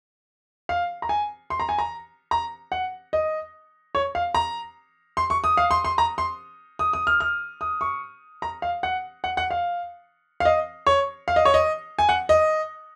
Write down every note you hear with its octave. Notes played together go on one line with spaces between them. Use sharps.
F5
A#5
G#5
C6
A#5
G#5
A#5
A#5
F#5
D#5
C#5
F5
A#5
C6
C#6
D#6
F5
C6
C6
A#5
C6
D#6
D#6
F6
F6
D#6
C#6
A#5
F5
F#5
F#5
F#5
F5
F5
D#5
C#5
F5
D#5
C#5
D#5
G#5
F#5
D#5